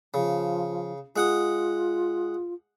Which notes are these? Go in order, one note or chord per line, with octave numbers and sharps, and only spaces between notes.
C#3 F3
G#3 F4 F#5 D#6